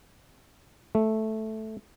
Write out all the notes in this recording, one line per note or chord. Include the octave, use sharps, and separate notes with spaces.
A3